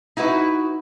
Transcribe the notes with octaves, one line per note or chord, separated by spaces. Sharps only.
D#4 E4 F#4 B4